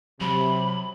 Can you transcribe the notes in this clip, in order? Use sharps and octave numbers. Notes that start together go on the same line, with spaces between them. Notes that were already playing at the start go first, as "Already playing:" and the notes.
C3 F#3 B5